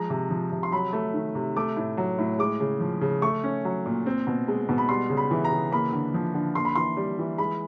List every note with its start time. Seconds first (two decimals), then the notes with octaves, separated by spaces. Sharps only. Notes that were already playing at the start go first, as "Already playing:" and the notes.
Already playing: F3 G#3 A#5
0.10 C3
0.30 F3
0.52 C3
0.63 C6
0.72 F#3 B5
0.93 A3
1.14 D#3
1.35 C3
1.56 A3 D6
1.76 A2
1.97 F#3
2.18 A2
2.39 G#3 D6
2.60 C#3
2.80 F3
3.01 C#3
3.22 A3 C#6
3.43 C#4
3.65 F#3
3.86 A#2
4.06 C4
4.27 B2
4.48 G#3
4.69 B2
4.78 B5
4.89 G3 C6
5.10 C#3
5.17 B5
5.31 E3
5.44 A#5
5.51 C#3
5.72 A#3 B5
5.93 D3
6.14 F3
6.34 D3
6.55 A#3 C6
6.65 B5
6.75 E3 C6
6.97 G3
7.19 E3
7.38 G#3 B5